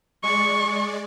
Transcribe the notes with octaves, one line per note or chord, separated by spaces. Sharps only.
G#3 D5 C#6